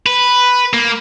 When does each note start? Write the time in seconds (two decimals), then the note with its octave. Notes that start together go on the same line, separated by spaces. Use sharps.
0.06 B4
0.73 A#3